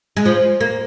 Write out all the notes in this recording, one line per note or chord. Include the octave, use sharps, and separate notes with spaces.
G#3
F3
A#3